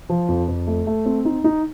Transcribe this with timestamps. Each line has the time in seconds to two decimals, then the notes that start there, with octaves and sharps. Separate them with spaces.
0.10 F3
0.28 F2
0.48 F2
0.67 A3
0.87 A3
1.06 C4
1.25 D#4
1.44 D#4